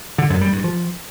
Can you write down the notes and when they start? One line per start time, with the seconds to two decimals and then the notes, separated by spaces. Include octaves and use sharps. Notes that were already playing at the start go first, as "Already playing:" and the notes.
0.18 D3
0.30 F#2
0.41 G3
0.53 G2
0.64 F3